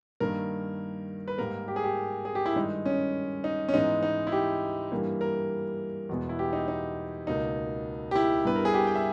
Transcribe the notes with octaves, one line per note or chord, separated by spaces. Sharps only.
G2 D#3 A#3 A#4
B4
G#2 G3 A#3 A#4
G4
G#4
G4
G#4
G4
E4
G2 D#3 G#3 D#4
C#4
D#4
C#4
G#2 E3 G#3 B3 D#4
D#4
E4
G4
G2 E3 G3 A#3
A#4
E2 B2 G#3 B3
E4
G4
D#4
D#4
C#2 B2 A#3 D#4
G4
E4
G2 G3 B3 B4
A#4
G#4
G4
G5
E5